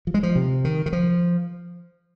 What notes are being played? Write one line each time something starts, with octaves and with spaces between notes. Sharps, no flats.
F3
G#3
F3
C3
D#3
D#3
F3